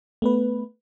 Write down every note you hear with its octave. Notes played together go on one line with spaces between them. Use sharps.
A3 B3 B4